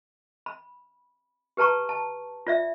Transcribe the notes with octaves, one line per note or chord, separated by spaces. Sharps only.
B5
G4 B4 A5 A#5 C#6
A5
F4 D5 E5